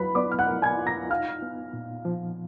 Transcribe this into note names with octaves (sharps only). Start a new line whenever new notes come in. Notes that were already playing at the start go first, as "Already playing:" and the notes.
Already playing: F#3 F4 B4 B5
B3 D5 D6
F6
F#5 F#6
A#4
G#5 G#6
F4
A#5 A#6
D#4 F5 F6
B3
A#2
F3